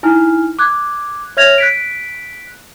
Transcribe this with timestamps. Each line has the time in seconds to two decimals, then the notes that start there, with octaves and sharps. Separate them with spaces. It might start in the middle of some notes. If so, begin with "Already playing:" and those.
0.03 D#4 E4 G#5 F6
0.59 D6 F#6 G#6
1.37 C#5 E5 F6 G#6 A#6 F7
1.58 F#6 B6 D7